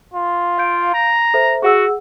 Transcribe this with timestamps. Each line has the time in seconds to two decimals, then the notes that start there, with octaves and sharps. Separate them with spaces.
0.14 F4
0.58 F5 G6 D7
0.94 A#5
1.34 A4 C5 E5
1.63 F#4 G#4 F#5 E6